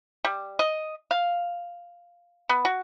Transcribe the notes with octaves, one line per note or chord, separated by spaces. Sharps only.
G3
D#5
F5
B3
F#4